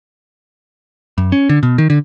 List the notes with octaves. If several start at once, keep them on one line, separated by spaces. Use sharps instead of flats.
F#2
C#4
D3
B2
D#3
D3